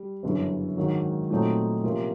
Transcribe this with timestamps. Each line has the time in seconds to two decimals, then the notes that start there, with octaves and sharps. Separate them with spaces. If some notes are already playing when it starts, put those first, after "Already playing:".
Already playing: G3
0.23 G1 F#2 C#3 E3
0.77 G#2 D#3 F#3
1.30 A#2 F#3 A3 C4 D#4
1.83 C3 F3 A#3 C#4 F4